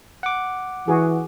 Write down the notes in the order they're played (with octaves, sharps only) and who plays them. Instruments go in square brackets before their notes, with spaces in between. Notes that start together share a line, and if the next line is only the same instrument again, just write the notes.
[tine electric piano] F#5 D6
[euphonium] E3 [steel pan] F#4 G#4